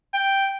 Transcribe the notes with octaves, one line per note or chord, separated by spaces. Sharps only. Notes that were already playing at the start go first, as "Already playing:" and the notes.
G5